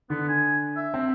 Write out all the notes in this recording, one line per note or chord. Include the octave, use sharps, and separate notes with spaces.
D3 B3
G#5
E5
C4